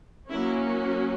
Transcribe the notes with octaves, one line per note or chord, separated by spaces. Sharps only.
F#3 A#3 C#4 E4